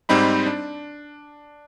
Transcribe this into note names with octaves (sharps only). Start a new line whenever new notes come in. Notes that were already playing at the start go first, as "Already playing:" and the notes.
G#2 G3 C4 D#4 B5
D4